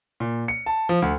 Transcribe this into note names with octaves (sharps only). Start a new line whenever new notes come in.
A#2
C#7
A5
F3
D2